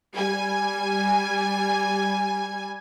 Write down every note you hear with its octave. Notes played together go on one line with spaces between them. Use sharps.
G3 G#5